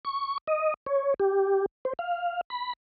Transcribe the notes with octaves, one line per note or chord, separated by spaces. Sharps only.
C#6
D#5
C#5
G4
C5
F5
B5